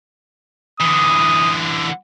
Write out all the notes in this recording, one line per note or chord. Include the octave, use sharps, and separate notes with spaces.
D3 E3 D#6